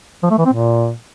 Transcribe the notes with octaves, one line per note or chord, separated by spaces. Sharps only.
F3
A3
E3
C4
A#2